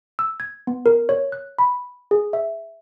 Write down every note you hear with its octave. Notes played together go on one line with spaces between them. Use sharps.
E6
G#6
B3
A#4
C#5
F#6
B5
G#4
E5